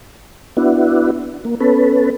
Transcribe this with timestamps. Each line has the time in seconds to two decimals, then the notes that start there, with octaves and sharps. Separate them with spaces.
0.57 B3 D4 E4 F#4
1.45 A#3
1.60 B3 C#4 A4 B4